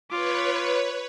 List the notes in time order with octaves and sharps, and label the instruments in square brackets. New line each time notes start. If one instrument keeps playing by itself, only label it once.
[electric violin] F4 D6 [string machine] B4 C#5